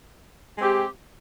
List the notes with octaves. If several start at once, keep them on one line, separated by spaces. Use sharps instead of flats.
G#3 C4 G4